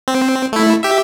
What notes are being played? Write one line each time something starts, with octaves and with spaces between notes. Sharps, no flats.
C4
A3 E4
G4 E5